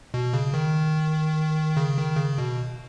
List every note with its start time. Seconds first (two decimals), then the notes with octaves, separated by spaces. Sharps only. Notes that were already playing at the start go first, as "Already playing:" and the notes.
0.14 B2
0.33 C#3
0.54 D#3
1.77 C#3
1.98 D#3
2.17 C#3
2.38 B2